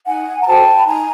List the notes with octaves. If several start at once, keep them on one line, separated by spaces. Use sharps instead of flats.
D#4 F#5 G#5
A#5
F#4 A4 C5 G5 A5
B5
D#4 G#5 A#5